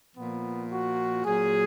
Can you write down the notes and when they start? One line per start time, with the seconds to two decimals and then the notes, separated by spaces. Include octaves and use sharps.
0.15 A#2 F3 B3
0.71 F#4
1.26 A#2 F#3 G#4